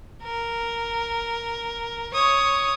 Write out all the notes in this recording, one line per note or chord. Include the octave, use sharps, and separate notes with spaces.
A#4
C#5 D#6